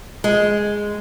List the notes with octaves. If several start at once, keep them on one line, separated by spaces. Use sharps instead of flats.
G#3